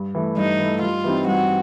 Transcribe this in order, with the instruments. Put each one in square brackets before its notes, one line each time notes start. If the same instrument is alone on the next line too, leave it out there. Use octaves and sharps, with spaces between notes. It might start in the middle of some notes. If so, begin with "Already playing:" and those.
Already playing: [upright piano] G2
E3 A3
[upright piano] G2 [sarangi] D#4
[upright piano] E3 A3
[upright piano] G2 [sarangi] F4
[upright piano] E3 G3 C4 D#4
[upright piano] G2 [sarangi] F#4